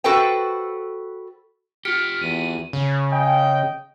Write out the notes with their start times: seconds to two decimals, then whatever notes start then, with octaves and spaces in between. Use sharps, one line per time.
0.04 F#4 A4 B4 C5 G5
1.85 F4 G4 F6 B6 C#7 D7
2.21 E2 D#7
2.73 C#3
3.11 D#5 G5